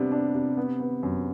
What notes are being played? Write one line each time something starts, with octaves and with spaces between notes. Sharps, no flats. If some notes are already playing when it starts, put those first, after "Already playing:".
Already playing: C3 G3 B3 D4
D4
C3
B3
B3
F#2